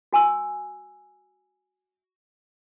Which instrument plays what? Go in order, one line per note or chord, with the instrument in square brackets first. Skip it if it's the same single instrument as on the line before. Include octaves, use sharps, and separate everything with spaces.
[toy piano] F#4 G#5 C#6 E6